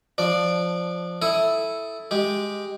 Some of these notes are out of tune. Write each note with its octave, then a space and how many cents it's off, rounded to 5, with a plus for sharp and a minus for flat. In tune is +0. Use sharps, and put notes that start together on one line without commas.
F3 +0 D4 +0 D5 +0
E4 +0 A4 +0 D#6 +10
G#3 +0 G4 +0